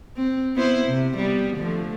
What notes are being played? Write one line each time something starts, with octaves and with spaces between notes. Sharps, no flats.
C4
B3 E4 C5
C3
G3 B3
D3 F3 A3